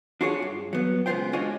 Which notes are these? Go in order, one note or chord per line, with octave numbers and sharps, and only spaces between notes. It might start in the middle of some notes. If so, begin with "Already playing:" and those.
D4 F4 F#4 G#4 C#5
G2
F#3 B3
C#3 G#3 B3 F4 C5 G5
G#3 D4 F4 F#4 C#5 D#5